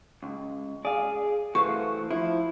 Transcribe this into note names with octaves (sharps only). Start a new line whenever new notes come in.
C#2
G#4 D5 F5
E3 A3 F#4 C5 F5 C#6
F3 E4